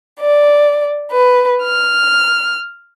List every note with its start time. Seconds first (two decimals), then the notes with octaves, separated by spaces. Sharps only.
0.18 D5
1.10 B4
1.62 F6